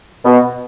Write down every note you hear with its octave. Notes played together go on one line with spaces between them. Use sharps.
B2